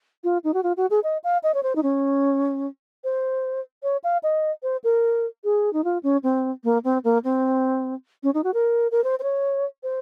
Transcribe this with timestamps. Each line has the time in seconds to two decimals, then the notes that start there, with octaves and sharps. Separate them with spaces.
0.24 F4
0.44 D#4
0.54 F#4
0.63 F4
0.77 F#4
0.90 G#4
1.03 D#5
1.24 F5
1.43 D#5
1.54 C#5
1.63 C5
1.75 D#4
1.83 C#4
3.04 C5
3.83 C#5
4.04 F5
4.23 D#5
4.63 C5
4.84 A#4
5.44 G#4
5.73 D#4
5.84 F4
6.03 C#4
6.23 C4
6.64 A#3
6.84 C4
7.04 A#3
7.24 C4
8.23 C#4
8.34 D#4
8.44 F#4
8.54 A#4
8.91 A#4
9.04 C5
9.19 C5
9.23 C#5
9.83 C5